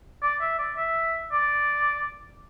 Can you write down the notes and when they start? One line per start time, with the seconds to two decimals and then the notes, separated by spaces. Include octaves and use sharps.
0.22 D5
0.41 E5
0.59 D5
0.77 E5
1.32 D5